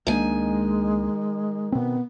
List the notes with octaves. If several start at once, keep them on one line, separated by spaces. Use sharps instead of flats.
C#2 D#3 G#3 A#3 D4 G#5
B2 B3 C4